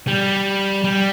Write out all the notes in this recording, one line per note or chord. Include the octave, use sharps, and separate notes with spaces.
G3
G3